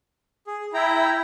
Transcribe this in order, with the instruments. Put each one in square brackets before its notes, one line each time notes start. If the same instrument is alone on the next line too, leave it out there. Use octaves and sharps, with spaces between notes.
[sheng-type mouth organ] G#4
[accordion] E4 [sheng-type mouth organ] G5 A#5